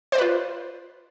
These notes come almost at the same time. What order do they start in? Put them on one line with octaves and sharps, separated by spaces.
C5 D5 B4 F4